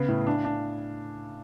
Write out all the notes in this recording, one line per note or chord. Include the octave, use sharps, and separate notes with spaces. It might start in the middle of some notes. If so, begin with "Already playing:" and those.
Already playing: C#3 B3
A2
D4
D4